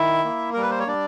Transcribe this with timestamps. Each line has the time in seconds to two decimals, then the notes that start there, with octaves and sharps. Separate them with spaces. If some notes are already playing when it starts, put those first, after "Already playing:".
Already playing: D#3 E4 E5
0.25 A#3
0.53 G3 A#4
0.62 B4
0.70 C5
0.79 C#5
0.87 G3 D4 D5